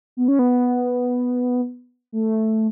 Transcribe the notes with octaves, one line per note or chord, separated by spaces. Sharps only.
B3
C#4
B3
A3